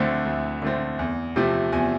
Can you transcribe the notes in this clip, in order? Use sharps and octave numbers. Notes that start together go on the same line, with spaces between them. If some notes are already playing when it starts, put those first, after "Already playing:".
Already playing: D2 D3 A3 C4
D2
D3 A3 C4
E2
C3 F3 A3 C4
E2 G#5